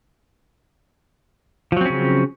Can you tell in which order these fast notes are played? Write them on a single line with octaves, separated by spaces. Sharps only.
F3 F#3 C4 C#4 C#3